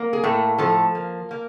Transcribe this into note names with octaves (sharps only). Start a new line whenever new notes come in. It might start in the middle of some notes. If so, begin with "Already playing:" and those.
Already playing: A#3
G#4
A2 A3 A4
F3 A3 A4
A#3
A#3